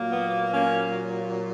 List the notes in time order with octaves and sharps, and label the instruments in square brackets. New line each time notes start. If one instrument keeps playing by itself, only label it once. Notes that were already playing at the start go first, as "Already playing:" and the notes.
Already playing: [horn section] A#2 F#3 A#3
B3
A#3 C#4